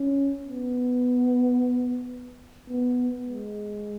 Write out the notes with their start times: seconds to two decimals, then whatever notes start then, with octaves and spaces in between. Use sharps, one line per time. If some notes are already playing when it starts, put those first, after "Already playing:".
Already playing: C#4
0.48 B3
2.69 B3
3.24 G#3